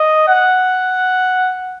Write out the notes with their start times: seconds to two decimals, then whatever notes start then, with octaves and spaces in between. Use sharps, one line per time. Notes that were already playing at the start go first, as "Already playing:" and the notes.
Already playing: D#5
0.28 F#5